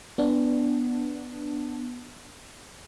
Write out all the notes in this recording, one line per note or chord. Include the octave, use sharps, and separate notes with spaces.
B3 D4